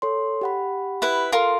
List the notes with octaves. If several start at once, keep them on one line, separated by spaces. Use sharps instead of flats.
A4 C#5 C6
G4 F#5 B5
E4 B4
F4 A4 A#4 C6